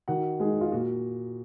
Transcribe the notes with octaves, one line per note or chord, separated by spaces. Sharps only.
D#3 F#4 F#5
G#3 D#4 G#4
F4
A#2 F#4